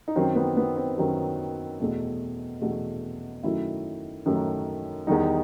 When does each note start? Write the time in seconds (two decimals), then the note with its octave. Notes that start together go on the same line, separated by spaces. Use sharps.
0.08 D#4
0.16 F#2 D#3 F#3 C4
0.36 B3
0.57 B3
0.77 C4
0.98 F#2 D#3 F#3
1.80 E2 B2 A3
2.61 E2 B2 A3 F#4
3.43 F#2 D#3 F#3 A3 E4
4.26 F#2 D#3 F#3 A3
5.07 E2 D#3 G3 D#4